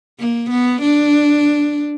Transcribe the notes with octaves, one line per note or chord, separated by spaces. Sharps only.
A#3
B3
D4